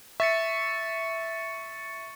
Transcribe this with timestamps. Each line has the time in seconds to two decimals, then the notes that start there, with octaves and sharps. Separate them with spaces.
0.20 E5 C#6 A6 C#7